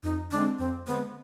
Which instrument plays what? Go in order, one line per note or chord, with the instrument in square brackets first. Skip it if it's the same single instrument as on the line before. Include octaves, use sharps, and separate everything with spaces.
[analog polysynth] F2 [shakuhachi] D#4
[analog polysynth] D3 G#3 C4 [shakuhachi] D4
[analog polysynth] F2 [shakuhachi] C4
[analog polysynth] D3 G#3 C4 [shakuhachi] B3